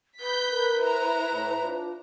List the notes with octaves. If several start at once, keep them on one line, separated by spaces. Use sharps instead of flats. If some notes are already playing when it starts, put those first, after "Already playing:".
B4 B5 G6 B6
A#4
E4 C5 A#5
A2
D4 F4